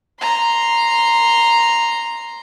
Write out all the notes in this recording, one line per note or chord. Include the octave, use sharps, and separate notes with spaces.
A#5 C6